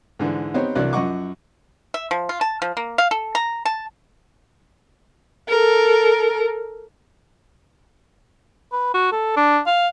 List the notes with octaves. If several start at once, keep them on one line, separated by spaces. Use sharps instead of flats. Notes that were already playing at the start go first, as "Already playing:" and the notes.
G#2 D3 E3
B3 C4 D#4 G4 C5 C#5
C2 E3 F#3 D4 F#6
F#2 F3 D#5 F#5 C#6 D6
E5
F3
F4
A5
F3
A#3
F5
A4
A#5
A5
A4 A#4
B4
F#4
A4
D4
F5